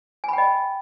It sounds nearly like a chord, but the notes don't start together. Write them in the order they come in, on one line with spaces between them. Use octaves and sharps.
G#5 B5 G5 D#5